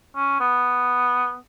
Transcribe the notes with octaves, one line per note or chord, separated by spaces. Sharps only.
C#4
B3